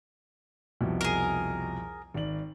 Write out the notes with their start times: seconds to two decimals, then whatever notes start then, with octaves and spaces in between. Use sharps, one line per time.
0.81 C2 F2 B2
1.01 G#4 A#4
2.14 G#1 D5 F#7